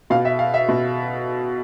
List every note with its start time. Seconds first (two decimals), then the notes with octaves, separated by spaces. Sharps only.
0.10 B2 F5
0.25 E5
0.39 F5
0.54 E5
0.68 B2